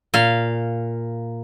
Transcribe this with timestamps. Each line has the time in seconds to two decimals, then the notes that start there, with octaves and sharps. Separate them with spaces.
0.14 A#2 F5